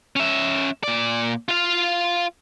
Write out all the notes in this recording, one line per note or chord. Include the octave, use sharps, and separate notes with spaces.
C#4 E5
A#2 D5
F4 F5